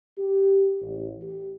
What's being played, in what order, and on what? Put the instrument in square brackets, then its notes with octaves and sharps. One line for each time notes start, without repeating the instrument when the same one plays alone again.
[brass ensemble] G4
A1
G4